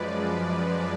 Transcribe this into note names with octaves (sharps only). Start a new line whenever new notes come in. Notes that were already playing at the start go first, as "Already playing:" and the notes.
Already playing: F#2 F3 G#3 B4 D5